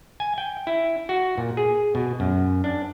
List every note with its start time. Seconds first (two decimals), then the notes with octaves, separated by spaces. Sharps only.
0.20 G#5
0.38 G5
0.67 E4
1.09 F#4
1.38 A#2
1.57 G#4
1.95 B2
2.20 F#2
2.64 D4